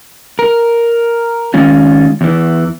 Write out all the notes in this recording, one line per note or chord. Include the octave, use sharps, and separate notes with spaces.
A#4
D#3 G#3 C#4 F4
E2 E3